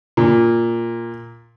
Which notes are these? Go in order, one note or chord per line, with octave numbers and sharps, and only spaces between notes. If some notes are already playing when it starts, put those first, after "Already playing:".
A#2